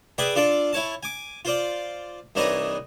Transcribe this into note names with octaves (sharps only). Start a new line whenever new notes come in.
G#4 B4 D5 E5 G5
D4 F4 A4 D5
E4 C#5 A5
G#5 D6
F4 C5 D5
C2 E3 D4 D#4 C#5 D#5